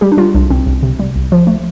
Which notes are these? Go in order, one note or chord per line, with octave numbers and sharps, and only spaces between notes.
G3 G4
D4
G3 F4
C2 D4
C2 C4
C2
C3
G3
C2
F3
A3